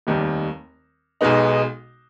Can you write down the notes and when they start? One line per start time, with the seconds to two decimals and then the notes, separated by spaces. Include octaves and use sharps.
0.07 F1 D#2 D#3 G3
1.21 B1 B2 G#3 B3 D#4